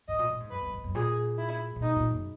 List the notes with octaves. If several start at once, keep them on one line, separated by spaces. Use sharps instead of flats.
G#2 D#5
A#2
A#2
G#2
F#2 B4
F#2
G#2
F#2
A#2 G#4
E4
A#2
B2 D#4
A#2
F#2